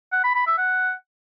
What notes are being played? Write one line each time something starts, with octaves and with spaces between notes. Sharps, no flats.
F#5
B5
B5
E5
F#5